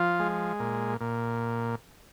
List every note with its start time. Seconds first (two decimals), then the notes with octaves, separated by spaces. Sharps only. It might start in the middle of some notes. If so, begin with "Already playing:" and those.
Already playing: F3 F4
0.20 G#3
0.60 A#2
1.01 A#2